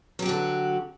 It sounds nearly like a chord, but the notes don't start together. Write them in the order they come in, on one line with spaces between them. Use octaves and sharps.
F#3 G4 F#4 D3